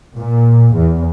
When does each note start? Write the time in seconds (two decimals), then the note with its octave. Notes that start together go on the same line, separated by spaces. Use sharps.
0.18 A#2
0.76 E2